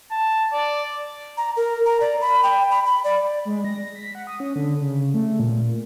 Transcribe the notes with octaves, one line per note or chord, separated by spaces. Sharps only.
A5
D5
A#5
A#4
A#5
D5
B5
G5
B5
B5
D5
G#3
A#6
B6
F#5
D#6
C#4
D3
C#3
A3
A#2